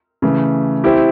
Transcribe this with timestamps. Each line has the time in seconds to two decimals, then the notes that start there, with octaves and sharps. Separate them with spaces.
0.22 C#3 E3 A3
0.84 C4 E4 G4